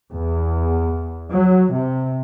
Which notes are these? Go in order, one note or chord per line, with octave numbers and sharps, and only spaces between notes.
E2
F#3
C3